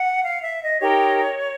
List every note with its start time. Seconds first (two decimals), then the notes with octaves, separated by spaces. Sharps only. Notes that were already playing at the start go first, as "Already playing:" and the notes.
Already playing: F#5
0.24 F5
0.43 E5
0.62 D#5
0.81 D#4 G4 A#4 C#5